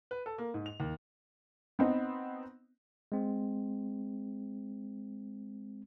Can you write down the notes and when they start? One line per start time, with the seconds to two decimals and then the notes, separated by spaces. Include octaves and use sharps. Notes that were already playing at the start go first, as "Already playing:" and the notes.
0.11 B4
0.26 A4
0.38 A#3
0.54 G#2
0.66 F7
0.80 D#2
1.79 B3 C4 D#4
3.12 G#3 C4